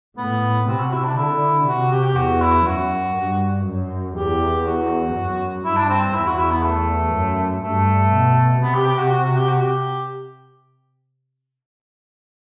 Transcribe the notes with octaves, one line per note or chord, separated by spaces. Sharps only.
A2 B3
C3 C4
F#4
E4
D4
D3 E4
C3 F#4
G4
G4
E2 F#4
E4
F#2 F#4
G2
F#2
E2 G4
F#4
F#2
G2 E4
D4
C4
C4
E2 E4
F#4
E4
B3
A3
F#2
G2 A3
B2
C3 B3
G4
G4
F#4
F#4
F#4
G4
F#4
G4